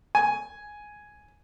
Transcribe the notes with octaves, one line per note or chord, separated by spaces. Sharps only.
G#5